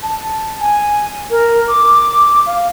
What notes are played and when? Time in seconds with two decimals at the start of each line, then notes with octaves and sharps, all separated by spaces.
0.03 A5
0.60 G#5
1.30 A#4
1.67 D6
2.46 F5